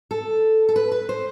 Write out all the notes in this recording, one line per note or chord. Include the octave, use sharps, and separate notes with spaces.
A4
A4
B4
B4
C5